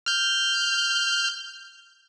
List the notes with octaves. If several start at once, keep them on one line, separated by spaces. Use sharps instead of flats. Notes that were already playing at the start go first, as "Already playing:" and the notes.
F6 G6